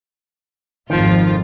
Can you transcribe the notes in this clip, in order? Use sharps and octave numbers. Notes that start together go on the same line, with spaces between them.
G#1 F2 D#3 F3 F4